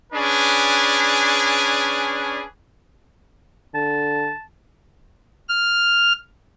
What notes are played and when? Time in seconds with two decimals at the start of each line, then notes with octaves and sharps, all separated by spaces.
0.13 C#4 D4 G#4 B4
3.75 D3 A5
5.49 F6